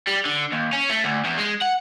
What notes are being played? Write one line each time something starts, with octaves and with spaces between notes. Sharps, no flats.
G3
D3
D#2
C#4
A3
D2
E2
G#3
F#5